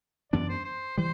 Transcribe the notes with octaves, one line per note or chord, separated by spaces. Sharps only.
F#2 E3 B3 D4 D5
C5
C5
E3 G3 C5